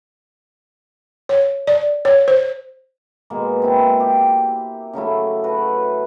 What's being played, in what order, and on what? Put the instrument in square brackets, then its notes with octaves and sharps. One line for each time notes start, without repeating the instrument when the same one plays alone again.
[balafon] C#5
D5
C#5
C5
[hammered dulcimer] B2 G#3 A#3
C4 E4
G4
C#3 F#3 A3 E4
F#4 B4 A5